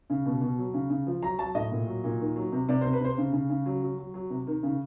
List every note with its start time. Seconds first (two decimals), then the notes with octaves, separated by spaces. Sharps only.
0.10 C#3
0.26 B2
0.41 B2
0.58 F#3
0.74 C#3
0.90 C#3
1.07 F3
1.23 F#3 A#5
1.39 F#3 A5
1.55 A2 D#5
1.71 A#2
1.87 F#3
2.04 A#2
2.20 D#3
2.36 F#3
2.52 C3
2.69 C3 D5
2.81 C3 C5
2.93 B4
3.00 C3 C5
3.18 C#3
3.33 C#3
3.50 C#3
3.66 F#3
3.82 F#3
3.98 F#3
4.14 F#3
4.30 C3
4.47 D#3
4.63 C#3